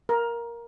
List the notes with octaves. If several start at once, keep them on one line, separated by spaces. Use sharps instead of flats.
A#4